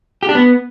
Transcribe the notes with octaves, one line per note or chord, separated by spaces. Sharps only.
G4
D4
B3